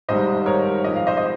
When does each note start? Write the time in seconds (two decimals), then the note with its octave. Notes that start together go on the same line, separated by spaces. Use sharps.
0.09 G#1 G#2 D#3 G3 C5 D#5
0.46 A#4 C#5
0.84 G#2 F3 G#3 C4 G4 D#5
0.96 F5
1.07 C5 D#5
1.17 D#5